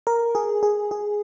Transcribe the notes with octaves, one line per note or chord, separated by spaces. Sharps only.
A#4
G#4
G#4
G#4